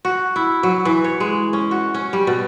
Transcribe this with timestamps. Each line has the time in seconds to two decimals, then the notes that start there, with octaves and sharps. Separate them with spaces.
0.05 F#4
0.36 E4
0.63 F#3
0.85 E3
1.04 C#5
1.20 G#3
1.53 C#4
1.71 F#4
1.94 C#4
2.13 G3
2.27 B2